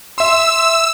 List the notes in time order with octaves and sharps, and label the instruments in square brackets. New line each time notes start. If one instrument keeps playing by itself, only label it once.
[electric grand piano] E5 C6 [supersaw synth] E6